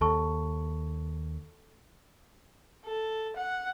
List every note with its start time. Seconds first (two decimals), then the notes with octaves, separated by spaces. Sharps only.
0.01 D#2 A4 A5 C#6
2.85 A4
3.37 F#5